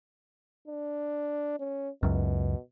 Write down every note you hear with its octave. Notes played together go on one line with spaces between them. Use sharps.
D4
C#4
C#2 F#2 B2